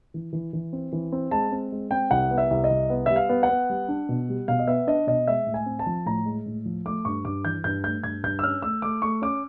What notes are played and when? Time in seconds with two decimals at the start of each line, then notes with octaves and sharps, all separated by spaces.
0.14 E3
0.33 E3
0.53 E3
0.73 C4
0.92 E3
1.12 C4
1.31 G#3 A5
1.52 C4
1.72 G#3
1.91 C4 G5
2.11 C2 F#5
2.31 B3
2.38 E5
2.51 C2
2.64 D#5
2.71 C2
2.90 B3
3.06 G3 E5
3.16 F5
3.29 B3
3.43 F#5
3.49 B3
3.70 G3
3.89 D4
4.09 B2
4.29 G3
4.48 B2 F5
4.59 D#5
4.68 B3 E5
4.87 D4 D#5
5.07 B2 D#5
5.27 G#3 E5
5.46 A2
5.54 G#5
5.66 C4
5.79 A5
5.86 F3
6.06 A2 A#5
6.26 G#3
6.46 A2
6.65 F3
6.86 A3 D6
7.05 G2 C#6
7.25 G2 D6
7.45 E3 G6
7.64 G2 G6
7.84 A3 G6
8.04 G2 G#6
8.23 G2 G6
8.39 E6
8.43 C#4 F6
8.62 A3 E6
8.82 A3 D6
9.02 A3 C#6
9.22 C#4 D6